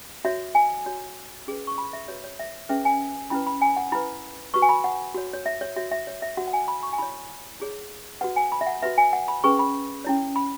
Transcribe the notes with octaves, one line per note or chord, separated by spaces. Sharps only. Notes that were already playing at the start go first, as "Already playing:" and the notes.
F#4 C#5 E5
G#5
F#4 C#5
C#4 G#4 B4
C#6
B5
E5
F#4 B4 C#5
C#5
E5
C#4 G#4 B4 E5
G#5
C#4 E4 B4 B5
B5
G#5
F#5
E4 B4 B5
F#4 B4 C#6
G#5
B5
F#5
F#4 C#5
C#5
E5
C#5
F#4 C#5 E5
E5
C#5
E5
F#4 C#5 F#5
F#5
G#5
B5
C#6
G#5
E4 C#5 B5
E4 G#4 C#5
F#4 B4 F#5
G#5
B5
E5
F#5
F#4 B4 E5
G#5
F#5
B5
C#4 G#4 B4 C#6
B5
C#4 E4 C#5
B5